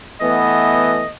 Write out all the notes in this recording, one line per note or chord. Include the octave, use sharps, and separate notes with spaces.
E3 A3 B3 D#5